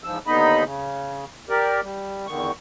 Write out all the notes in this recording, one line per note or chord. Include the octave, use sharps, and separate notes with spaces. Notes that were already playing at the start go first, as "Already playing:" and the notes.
E2 G#2 F3 E6
D#2 D3 B3 D#4 D#5 B5
C#3
G4 A#4 D5
G3
E2 D3 D#3 C#6